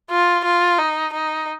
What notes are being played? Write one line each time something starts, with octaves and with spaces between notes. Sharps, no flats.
F4
F4
D#4
D#4